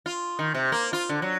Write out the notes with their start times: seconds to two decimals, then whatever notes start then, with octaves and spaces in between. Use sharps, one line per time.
0.06 F4
0.39 D#3
0.54 C3
0.72 A#3
0.93 F4
1.09 D3
1.22 F#3